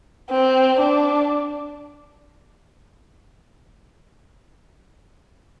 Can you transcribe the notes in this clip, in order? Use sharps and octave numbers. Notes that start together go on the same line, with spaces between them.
C4
D4